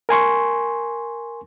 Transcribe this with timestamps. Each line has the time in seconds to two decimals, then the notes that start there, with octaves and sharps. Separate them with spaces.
0.09 A#4 G#5 C6 C#6